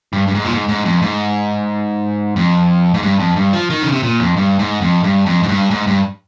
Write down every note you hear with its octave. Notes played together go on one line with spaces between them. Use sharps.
G2
G2
G#2
A#2
G#2
G#2
F2
G#2
F2
G#2
G2
F2
G2
F3
D#3
C#3
C3
A#2
F2
G2
G#2
F2
G2
F2
G#2
G2
G#2
G2